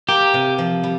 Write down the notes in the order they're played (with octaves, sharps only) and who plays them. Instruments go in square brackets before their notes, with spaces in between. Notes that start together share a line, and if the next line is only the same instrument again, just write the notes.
[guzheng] A#3 [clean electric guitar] G4
[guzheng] C3
F3
G3